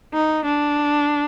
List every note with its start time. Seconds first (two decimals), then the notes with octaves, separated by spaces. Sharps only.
0.14 D#4
0.45 D4